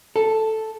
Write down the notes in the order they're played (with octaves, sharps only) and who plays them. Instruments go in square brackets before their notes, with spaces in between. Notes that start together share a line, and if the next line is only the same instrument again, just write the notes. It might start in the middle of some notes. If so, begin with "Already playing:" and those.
[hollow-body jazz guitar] A4